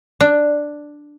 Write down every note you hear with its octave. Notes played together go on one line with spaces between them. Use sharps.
D4